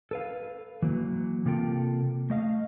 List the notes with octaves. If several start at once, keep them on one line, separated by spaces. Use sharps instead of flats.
A4 B4 F5
E3 F#3 A#3
C3 A#3 F4 A4 G5
A3 D#5 F5